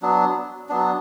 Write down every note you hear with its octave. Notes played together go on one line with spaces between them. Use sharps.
F#3 B3 D4
F#3 B3 D4